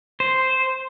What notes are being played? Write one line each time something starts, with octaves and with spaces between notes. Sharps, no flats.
C5